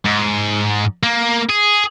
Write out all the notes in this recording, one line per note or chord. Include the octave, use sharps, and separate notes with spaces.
G#2
A#3
G#4